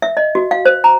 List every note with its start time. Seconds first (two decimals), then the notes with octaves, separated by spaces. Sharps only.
0.02 E5
0.17 D#5
0.35 F#4
0.51 F5
0.65 C5
0.84 A#5